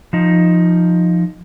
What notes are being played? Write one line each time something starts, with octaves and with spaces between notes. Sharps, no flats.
F3 D#4